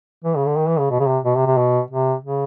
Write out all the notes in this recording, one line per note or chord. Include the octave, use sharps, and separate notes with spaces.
E3
C#3
D3
D#3
E3
C#3
B2
C#3
C3
B2
C3
C3
B2
C3
C#3